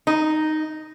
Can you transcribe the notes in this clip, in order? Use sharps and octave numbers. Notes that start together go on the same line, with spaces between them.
D#4